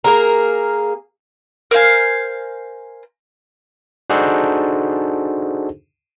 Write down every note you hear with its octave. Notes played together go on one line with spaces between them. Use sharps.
A#3 G#4 A#4
A#4 C5 F5 G#5
D4 D#4 F#4 G#4 A4 C5